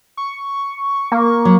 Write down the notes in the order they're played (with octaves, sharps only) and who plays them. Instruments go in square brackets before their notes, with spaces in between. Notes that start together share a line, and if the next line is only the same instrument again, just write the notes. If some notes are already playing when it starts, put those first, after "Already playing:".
[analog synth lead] C#6
[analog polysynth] A#3
[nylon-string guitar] F#3 [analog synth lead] C#5